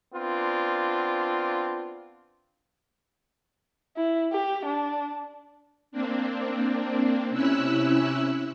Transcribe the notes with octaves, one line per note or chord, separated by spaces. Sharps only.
B3 C4 D4 F4
E4
G4
D4
A#3 C4 D4
C3 C#4 E4 E6 F#6